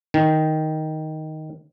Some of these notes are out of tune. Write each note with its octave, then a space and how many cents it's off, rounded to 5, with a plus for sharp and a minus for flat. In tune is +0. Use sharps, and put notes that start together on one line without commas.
D#3 +5